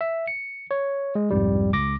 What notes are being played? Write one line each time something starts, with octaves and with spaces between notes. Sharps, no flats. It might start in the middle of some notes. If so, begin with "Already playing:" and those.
E5
C#7
C#5
G#3
C2 F2 G#2 G3
C#2 D6 A#6